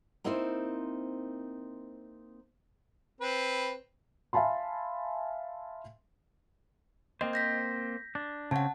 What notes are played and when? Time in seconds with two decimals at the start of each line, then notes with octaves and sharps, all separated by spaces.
0.24 A#3 C4 D#4 E4 A#4 C5
3.21 C4 B4
4.33 E5 F5 G#5 A5 B5 C6
7.21 A#3 C4 C5 D#5
7.33 G6 A#6 B6
8.15 D4
8.51 C#3 C4 C#4 F#5 A5